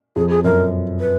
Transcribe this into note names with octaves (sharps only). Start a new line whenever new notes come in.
F2 G#4
G#4
F#2 A#4
B4